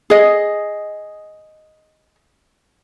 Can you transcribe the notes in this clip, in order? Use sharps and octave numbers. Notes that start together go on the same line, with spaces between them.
G#4 D#5